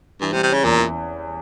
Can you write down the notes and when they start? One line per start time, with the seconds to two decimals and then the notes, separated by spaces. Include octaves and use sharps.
0.21 G2 E3
0.32 C3
0.35 G3
0.43 C3
0.49 C#3 C#4
0.64 E2 A#2
0.78 E3